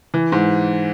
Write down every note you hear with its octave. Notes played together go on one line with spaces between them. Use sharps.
E3
G#2